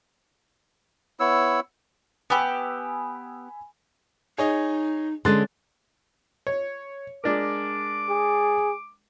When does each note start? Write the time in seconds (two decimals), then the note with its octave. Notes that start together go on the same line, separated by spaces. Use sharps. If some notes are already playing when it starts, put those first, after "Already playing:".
1.20 B3 E4 C#5 E6
2.30 B3 G4 G#5 B5 E6
4.38 D#4 G#4 C#5 D#5
5.25 D3 G#3 C#4 C6 F#6 A6
6.47 C#5
7.24 G#3 D4 A#4 D6
8.09 G#4